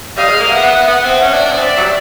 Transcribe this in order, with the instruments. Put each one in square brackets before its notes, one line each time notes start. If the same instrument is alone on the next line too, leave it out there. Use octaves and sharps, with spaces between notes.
[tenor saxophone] G3 [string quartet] D#5 F5
[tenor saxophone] G#3
A#3
[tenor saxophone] B3 [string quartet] E5 F#5
[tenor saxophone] B3
B3
[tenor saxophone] B3 [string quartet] E5 F#5
[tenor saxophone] C4
C#4
D4
D4
B3
[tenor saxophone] C4 [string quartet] D5 E5
[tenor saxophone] F#3
G3